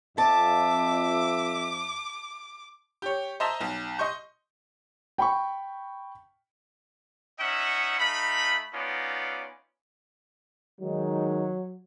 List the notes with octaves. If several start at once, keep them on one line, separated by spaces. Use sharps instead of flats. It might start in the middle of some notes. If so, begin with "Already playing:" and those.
F2 E5 A5 D6
G4 C#5
C5 D#5 E5 A5 A#5 C6
B1
D#5 C6 C#6 G6
G5 B5 C#6
C#4 D#4 D#5 E5 F#5
A3 D#4 F5 B5
B3 C#4 D#4 F4 D5
D#3 F#3 G#3 D#4